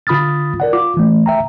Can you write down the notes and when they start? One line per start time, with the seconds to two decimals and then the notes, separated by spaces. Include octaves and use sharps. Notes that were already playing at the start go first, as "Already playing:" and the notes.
0.07 D3 F4 B5 D#6 F6 A6
0.60 A#4 D5 F#5
0.73 F4 D6
0.97 E3 A3
1.26 E5 G5 A#5